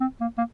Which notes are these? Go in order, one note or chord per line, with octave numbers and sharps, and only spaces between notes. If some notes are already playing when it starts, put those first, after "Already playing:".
C4
A#3
A#3